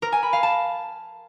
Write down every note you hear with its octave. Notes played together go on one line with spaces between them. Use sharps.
A#4
G#5
B5
F5
A5